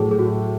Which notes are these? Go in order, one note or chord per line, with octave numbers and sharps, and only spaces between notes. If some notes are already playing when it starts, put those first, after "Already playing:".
Already playing: A2 F#3 A3 G#4
G#4
F#4